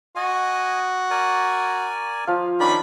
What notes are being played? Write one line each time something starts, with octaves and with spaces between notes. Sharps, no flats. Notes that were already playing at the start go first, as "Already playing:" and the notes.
F#4 D#5 G#5
A#4 D5 G#5
F3 F5
D#3 C#4 D4 D5 A#5 B5